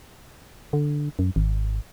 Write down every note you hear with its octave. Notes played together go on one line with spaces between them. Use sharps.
D3
F#2
G#1